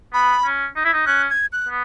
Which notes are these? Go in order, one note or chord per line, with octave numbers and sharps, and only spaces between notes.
B3 B5
C#4
D#4
E4
D#4
C#4 F#6
G#6
F#6
B3